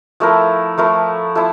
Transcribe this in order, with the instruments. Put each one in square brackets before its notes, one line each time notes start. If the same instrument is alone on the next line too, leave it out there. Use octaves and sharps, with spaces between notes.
[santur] F3 A3 E4 A#4
F3 A3 E4 A#4
F3 A3 E4